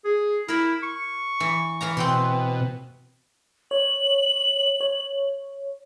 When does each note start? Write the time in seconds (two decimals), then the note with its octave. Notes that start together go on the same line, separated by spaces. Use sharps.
0.05 G#4
0.48 E4 A#4 B5
0.83 C#6
1.40 E3
1.81 E3 F5 A#5
1.97 B2 C4 G5 C6
3.71 C#5 F#7
4.80 C#5